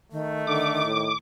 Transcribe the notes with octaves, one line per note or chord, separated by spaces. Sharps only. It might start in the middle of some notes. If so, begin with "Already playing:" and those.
D#3 A3
D3 D6
A2